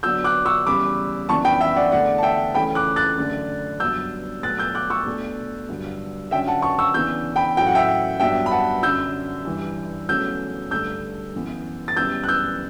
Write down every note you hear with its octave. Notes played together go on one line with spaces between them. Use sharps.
D3 F#3 B3 D4 E6 G6
D6 F#6
C#6 E6
E2 C#3 G3 B5 D6
F#2 E3 B3 D4 A5 C#6
G5 B5
E5 G5
D5 F#5
E2 D3 A3 D5 F#5
A5
E5 G5
C#3 E3 A3 C#4 G5 B5
D6 F#6
F#6 A6
F#2 D3 A3 D4
G2 F#3 B3 D4 E6 G6
B2 F#3 A3 F#6 A6
E6 G6
D6 F#6
C#6 E6
B2 A3 D4
G2 D3 F#3
D3 F#3 C#4 E5 G5
F#5 A5
A5 C#6
C#6 E6
C#3 E3 B3 D4 E6 G6
G5 B5
A2 F#3 C#4 G5
F#5
E5 G5
G2 F#3 B3 D4 E5 G5
B5
F#5 A5
F#2 D3 F#3 E6 G6
G2 E3 G3
E2 C#3 F#3 A3 C#4 E6 G6
G2 D3 A3 D4 E6 G6
F#2 E3 B3
A6
F#2 C#3 E3 G3 B3 E6 G6
F#6
E6 G6